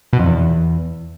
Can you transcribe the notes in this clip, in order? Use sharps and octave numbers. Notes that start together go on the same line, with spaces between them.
B2
F2
E2